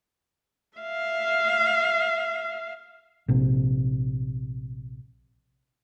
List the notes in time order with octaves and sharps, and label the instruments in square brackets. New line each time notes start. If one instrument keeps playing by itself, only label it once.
[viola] E5 F5
[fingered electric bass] A#1 C3